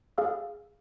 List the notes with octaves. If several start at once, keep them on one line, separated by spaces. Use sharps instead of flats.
G#4 F5 E6